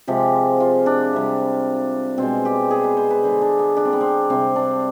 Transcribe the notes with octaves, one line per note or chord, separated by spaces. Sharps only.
C3 F3 G#3 G4
F4
D4
C3 G3
B2 G#3 C4
G4
G#4
B4
C5
B4
D3 G#3 C5
D4
B3
D4
C4
B3
C4
C3 G3 C4
D4